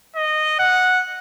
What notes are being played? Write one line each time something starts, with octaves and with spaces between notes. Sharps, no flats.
D#5
F#5